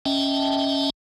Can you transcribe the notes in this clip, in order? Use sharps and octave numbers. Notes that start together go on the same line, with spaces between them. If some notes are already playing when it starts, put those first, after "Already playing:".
C#4 D#5 E5 G5 A5